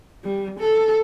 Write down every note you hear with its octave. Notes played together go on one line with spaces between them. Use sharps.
G3
A4